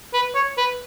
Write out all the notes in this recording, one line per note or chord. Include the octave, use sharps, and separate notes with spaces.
B4
C#5
B4